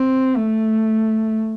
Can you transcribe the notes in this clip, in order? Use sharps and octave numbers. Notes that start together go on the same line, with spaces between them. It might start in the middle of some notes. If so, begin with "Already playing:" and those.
Already playing: C4
A3